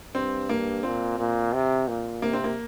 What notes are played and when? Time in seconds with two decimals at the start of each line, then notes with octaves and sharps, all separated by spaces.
0.14 G2 C4
0.49 A#3
0.83 A#2 C4
1.18 A#2
1.53 C3
1.88 A#2
2.22 C3 A#3
2.33 C4
2.44 A#3